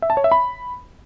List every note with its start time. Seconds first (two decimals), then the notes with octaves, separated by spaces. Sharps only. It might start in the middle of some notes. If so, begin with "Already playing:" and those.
0.02 E5
0.10 A5
0.17 C#5
0.24 E5
0.32 B5